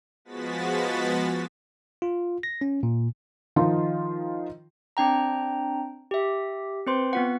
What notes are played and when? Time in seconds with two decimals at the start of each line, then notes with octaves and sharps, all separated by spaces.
0.25 F3 G#3 B3 F#4 A6 B6
2.02 F4
2.43 A#6
2.61 C#4
2.83 A#2
3.56 D#3 F3 D#4 F4
4.97 C4 D4 G5 A#5
6.11 G4 E5
6.87 C4 B4 C5 C6
7.13 B3 F4 F#5